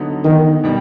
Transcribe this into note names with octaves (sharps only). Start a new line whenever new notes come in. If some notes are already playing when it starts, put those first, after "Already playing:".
Already playing: D3 F#3 B3 D#4
D#3
B2 G3